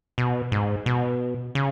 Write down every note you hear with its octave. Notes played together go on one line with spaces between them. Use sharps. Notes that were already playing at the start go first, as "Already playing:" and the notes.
B2
G#2
B2
C#3